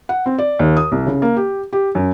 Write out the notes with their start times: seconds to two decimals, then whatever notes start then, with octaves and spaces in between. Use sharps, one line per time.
0.09 F#5
0.26 C4
0.39 D5
0.59 D#2
0.77 D#6
0.92 C2
1.07 C#3
1.22 A#3
1.37 G4
1.73 G4
1.95 F#2